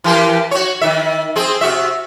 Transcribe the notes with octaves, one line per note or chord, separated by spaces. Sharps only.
E3 G4 A#4
F#4 C#5
D#3 E5
C4 G#4
C3 F#4 E5